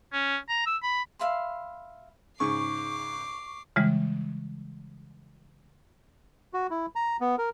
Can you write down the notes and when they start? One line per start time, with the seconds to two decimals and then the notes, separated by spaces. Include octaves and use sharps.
0.13 C#4
0.49 A#5
0.66 E6
0.83 B5
1.19 E5 F5 B5 C6
2.40 G#2 C#3 G#4 C#6 D6 C7
3.76 C#3 E3 G3 G#3
6.54 F#4
6.70 E4
6.95 A#5
7.21 B3
7.38 A#4